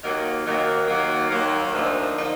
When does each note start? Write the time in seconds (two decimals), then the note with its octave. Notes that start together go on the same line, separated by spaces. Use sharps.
0.02 D#2 D#3 F#3 A#3
0.45 D#2 D#3 F#3 A#3
0.87 D#2 D#3 F#3 A#3
1.30 D#2 D#3 F#3 A#3
1.73 D2 D3 F3 A#3 D#4
2.17 D3 F3 A#3 D#4